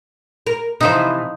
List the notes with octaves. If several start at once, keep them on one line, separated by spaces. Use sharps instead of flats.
A#4
C3 E3 F3 D#4 C5